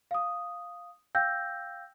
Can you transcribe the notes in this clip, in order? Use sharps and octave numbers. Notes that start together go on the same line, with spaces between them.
F5 D#6
F5 G5 E6 G6 A#6